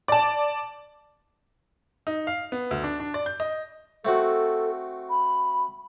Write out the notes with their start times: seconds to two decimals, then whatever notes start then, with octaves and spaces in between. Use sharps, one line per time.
0.08 D5 A5
2.07 D#4
2.27 F5
2.52 B3
2.71 D2
2.84 D4
3.00 D4
3.14 D5
3.26 G6
3.40 D#5
4.05 A3 C4 F#4 A4
5.10 B5